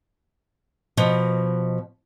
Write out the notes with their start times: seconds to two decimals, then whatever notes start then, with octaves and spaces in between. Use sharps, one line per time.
0.97 B2 F3 D#5 F#5